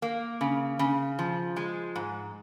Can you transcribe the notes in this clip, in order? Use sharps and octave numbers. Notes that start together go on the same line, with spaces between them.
A#3
C#3
C#3
F3
G#3
G#2